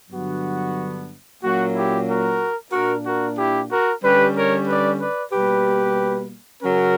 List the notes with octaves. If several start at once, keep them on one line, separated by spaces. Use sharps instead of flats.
G2 D3 F#3 B3 D4 F#4
A#2 F#3 A#3 C#4 F#4
E4 G4
F#4 A#4
A#2 A#3 D4 F#4 A#4
F#4 A#4
E4 G4
F#4 A#4
D3 G3 C#4 G4 B4
A#4 C#5
B4 D5
B4 D5
B2 G3 A#3 G4 B4
C#3 F#3 C#4 F#4 A#4